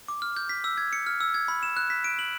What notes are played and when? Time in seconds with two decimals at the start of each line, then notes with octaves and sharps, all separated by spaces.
0.08 D6
0.22 F6
0.37 G6
0.49 B6
0.64 E6
0.78 G#6
0.93 C#7
1.07 F6
1.20 E6
1.34 G#6
1.48 B5
1.63 E7
1.77 F#6
1.90 B6
2.04 D7
2.19 F#7